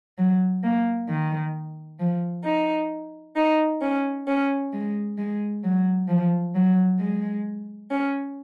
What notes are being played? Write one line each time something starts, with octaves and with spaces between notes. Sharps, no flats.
F#3
A#3
D#3
F3
D#4
D#4
C#4
C#4
G#3
G#3
F#3
F3
F#3
G#3
C#4